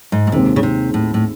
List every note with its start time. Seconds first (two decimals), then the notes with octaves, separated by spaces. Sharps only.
0.12 G#2
0.27 A2
0.32 D#2 C3 D#3 G#3 C4
0.56 C#3
0.63 C3
0.94 A2
1.14 A2